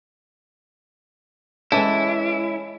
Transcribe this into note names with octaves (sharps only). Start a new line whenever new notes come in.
E3 G#3 C#4 E4 A4